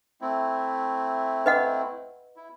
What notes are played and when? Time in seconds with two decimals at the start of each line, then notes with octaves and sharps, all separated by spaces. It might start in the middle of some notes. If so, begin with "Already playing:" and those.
0.21 A3 C4 E4
1.46 B4 D#5 F#5
2.36 E4